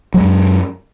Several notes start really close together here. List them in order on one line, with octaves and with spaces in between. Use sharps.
F#3 G#3 F#2